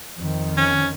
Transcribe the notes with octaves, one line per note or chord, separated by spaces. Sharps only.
F2 D#3
C#4